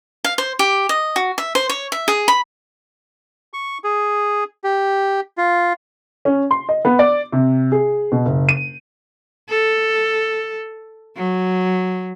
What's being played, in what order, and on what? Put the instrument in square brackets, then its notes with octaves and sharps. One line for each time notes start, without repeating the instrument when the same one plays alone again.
[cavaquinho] F5
C5
G4
D#5
F#4
E5
C5
C#5
E5
G#4
B5
[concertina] C#6
G#4
G4
F4
[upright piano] C#4
C6
D#5
B3
D5
C3
G#4
B2
F#1
D#7
[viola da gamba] A4
F#3